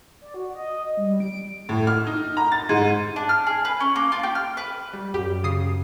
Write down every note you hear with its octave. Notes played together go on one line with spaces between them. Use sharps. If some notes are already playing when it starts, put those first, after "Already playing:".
D5
F#4
D#5
G3
D7
A2
F6
D#4
A#5
A6
G#2
D4
F6
G#4
B4
C#4
A#3
F4
G4
F6
B4
G3
F#2 G4
C#3 D#6 C7